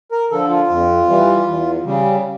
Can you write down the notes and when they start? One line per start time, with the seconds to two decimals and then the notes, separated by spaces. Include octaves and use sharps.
0.12 A#4
0.31 D3 F3 A4
0.50 F4
0.69 F2
1.09 E3 G3
1.46 E2
1.85 C#3 G3